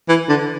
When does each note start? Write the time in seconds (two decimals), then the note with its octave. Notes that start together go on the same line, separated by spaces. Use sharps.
0.09 E3
0.29 D3